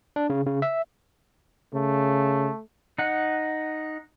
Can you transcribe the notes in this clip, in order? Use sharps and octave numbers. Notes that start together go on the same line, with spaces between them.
D4
C#3
C#3
E5
C#3 A3
D#4 F#5